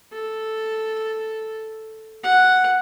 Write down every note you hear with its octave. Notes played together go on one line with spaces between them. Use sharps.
A4
F#5